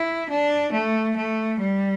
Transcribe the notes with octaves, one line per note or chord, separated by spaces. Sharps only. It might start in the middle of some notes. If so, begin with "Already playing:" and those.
Already playing: E4
D4
A3
A3
G3